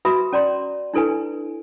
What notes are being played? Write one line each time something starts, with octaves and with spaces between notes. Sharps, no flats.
F#4 B4 E5 A#5 B5 D#6
C#4 D5 A#5 C6
D4 E4 A4 B4 G#5